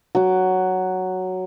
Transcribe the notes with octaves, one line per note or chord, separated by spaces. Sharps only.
F#3 D6